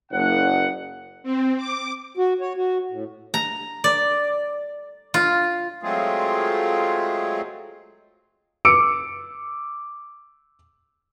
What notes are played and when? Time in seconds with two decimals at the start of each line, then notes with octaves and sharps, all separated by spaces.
0.12 F#1 F#5
1.23 C4
1.57 D6
2.17 F#4
2.40 C#5
2.56 F#4
2.90 A2
3.34 A#5
3.84 D5
5.14 F4
5.83 F#3 G#3 A3 C4 F4 G#4
8.65 D6 E6 C#7 D7